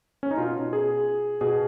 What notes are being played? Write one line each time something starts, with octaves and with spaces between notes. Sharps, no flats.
C#4
D#4
B2 F4
G#4
B2 G#4